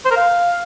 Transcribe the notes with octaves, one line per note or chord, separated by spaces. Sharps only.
C5
A#4
F5